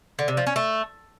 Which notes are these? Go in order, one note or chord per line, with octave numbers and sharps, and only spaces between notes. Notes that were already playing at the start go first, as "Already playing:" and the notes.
D3
C3
F3
C#4
A3